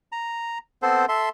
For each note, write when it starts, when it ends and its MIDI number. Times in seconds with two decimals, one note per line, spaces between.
0.12 0.58 82
0.83 1.06 59
0.83 1.06 60
0.83 1.06 69
0.83 1.06 72
1.09 1.29 69
1.09 1.29 76
1.09 1.29 84